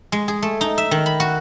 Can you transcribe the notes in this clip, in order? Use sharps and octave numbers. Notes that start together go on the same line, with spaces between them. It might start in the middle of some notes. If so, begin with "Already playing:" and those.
G#3
G#4
A3
D#4
E5
D#3
B5
F#4